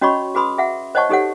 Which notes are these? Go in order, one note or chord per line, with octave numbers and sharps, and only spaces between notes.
C#4 F#4 C#5 D#5 B5 C#6
F#4 G#4 B4 B5 C6 D#6
G#4 E5 F#5
C5 C#5 D#5 F#5 A5 C#6
D#4 G4 A4 C#5 F#5